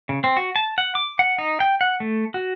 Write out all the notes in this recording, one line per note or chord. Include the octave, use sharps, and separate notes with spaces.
C#3
C4
F#4
A5
F#5
D6
F#5
D#4
G5
F#5
A3
F#4